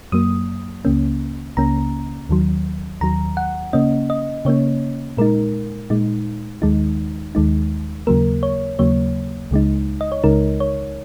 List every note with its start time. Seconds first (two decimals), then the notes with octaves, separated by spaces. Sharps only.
0.12 F#2 F#3 A#3 D#6
0.85 C#2 C#3 A#3 C#4
1.57 C#2 C#3 A#3 C#4 A#5
2.29 D#2 D#3 F#3
3.01 D#2 D#3 F#3 A#5
3.37 F#5
3.73 C#3 A#3 C#4 D#5
4.10 D#5
4.45 C#3 A#3 C#4 C#5
5.17 A#2 G#3 D#4 A#4
5.90 A#2 G#3 D#4
6.62 D#2 D#3 G#3 D#4
7.35 D#2 D#3 G#3 D#4
8.07 D#2 C#3 F#3 A#3 A#4
8.43 C#5
8.79 D#2 C#3 F#3 A#3 C#5
9.51 C#2 C#3 G#3 D#4
10.01 D#5
10.12 C#5
10.23 C#2 C#3 G#3 D#4 A#4
10.60 C#5